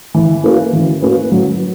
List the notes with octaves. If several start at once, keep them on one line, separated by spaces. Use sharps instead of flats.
E3
A#3 C#4 F#4 B4
E3
A#3 C#4 F#4 B4
F#3